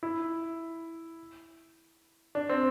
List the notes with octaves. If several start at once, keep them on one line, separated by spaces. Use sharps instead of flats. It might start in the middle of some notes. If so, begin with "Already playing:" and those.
E4
D4
C4